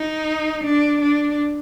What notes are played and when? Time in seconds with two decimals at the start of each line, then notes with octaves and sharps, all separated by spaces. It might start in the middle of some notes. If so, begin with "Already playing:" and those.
Already playing: D#4
0.63 D4
1.01 D4